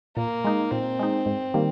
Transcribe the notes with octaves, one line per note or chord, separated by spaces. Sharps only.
A#2 A#3
G#3 D#4
A#2 C4
G#3 D#4
G#2
D#3 G3 A#3